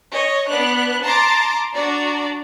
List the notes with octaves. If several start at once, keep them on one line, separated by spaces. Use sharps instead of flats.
C#5 D#5
B3 D4 F#6
A5 A#5 C6 D6 A6
D4 F#4 D5 A#5